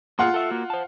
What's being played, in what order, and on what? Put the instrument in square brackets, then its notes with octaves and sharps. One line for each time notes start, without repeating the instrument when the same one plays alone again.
[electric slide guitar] A#3 G#4 [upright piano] F4 F#5 C6
[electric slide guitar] A4 E5
A#3 F#4
C5 A5